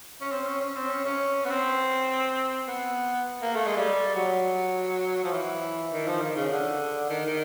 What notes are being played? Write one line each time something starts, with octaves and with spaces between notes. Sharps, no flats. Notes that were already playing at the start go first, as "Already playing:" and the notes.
C#4
C4
C#4
C#4
C4
C#4
C#4
B3
C4
B3
A#3
A3
G#3
G3
F#3
F3
E3
D#3
F3
D#3
C#3
D3
D#3
D#3